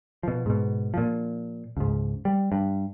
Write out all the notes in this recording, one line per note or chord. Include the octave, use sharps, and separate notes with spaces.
B2 F3
G#2 B2
A#2 F3
C#2 G#2
G3
G2